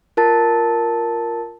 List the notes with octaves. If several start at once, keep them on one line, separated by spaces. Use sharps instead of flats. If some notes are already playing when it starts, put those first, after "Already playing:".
F4 A#4 A5 A6